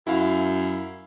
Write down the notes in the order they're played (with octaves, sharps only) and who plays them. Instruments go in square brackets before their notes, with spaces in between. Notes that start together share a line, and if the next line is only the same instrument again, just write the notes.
[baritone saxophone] F#2 [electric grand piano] E4 F5